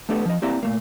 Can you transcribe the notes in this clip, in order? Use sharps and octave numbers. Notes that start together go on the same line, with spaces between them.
A3 B3 D4 G4 A4
F3 D#5
A#3 C4 E4 G4 D5 A#5
A#2 A3 A#3